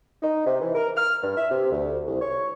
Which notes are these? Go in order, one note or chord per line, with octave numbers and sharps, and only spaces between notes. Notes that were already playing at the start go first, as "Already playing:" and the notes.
D#4
C3
E3
A#4
F6
G2
E5
C3
D2
C2
C#5